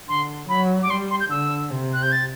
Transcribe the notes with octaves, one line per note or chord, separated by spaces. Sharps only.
D3 C6
F#3 B5
D6
G3 C6
C6
G6
D3 E6
C3
F#6
G6
A6